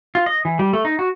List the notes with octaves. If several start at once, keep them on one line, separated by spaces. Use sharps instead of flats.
F4
D#5
E3
G3
A3
D#4
F#4